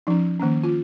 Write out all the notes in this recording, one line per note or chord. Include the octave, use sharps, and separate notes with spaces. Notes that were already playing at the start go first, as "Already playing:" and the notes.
F3 C#4 D#4
D#3 A#3 C#4
F4